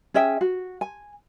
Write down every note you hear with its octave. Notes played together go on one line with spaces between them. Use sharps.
C#4 G#4 E5 G5
F#4
G#5